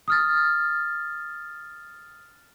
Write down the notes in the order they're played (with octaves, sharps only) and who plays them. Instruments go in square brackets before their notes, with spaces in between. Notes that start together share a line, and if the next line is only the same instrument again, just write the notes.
[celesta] D#6 F6 A6